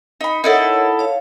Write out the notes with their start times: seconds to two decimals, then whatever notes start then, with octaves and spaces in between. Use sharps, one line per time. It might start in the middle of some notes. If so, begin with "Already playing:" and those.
0.21 D#4 B5
0.44 D#4 E4 A4 A#4 C#5 F#5
0.99 C#5 F5